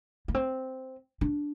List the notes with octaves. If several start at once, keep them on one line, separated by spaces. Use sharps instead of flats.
A#3
C4
D4